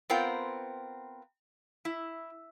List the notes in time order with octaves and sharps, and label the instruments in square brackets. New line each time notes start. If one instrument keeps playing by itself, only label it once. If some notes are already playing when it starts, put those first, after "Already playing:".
[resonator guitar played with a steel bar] B3 C4 F4 A#4 G5
E4